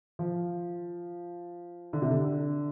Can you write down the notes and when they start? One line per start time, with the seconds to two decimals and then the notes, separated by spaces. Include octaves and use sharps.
0.19 F3
1.93 D3
2.02 C3
2.11 D3